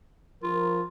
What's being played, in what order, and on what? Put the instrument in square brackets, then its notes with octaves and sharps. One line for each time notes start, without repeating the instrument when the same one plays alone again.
[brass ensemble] F3 A#4 [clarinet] F4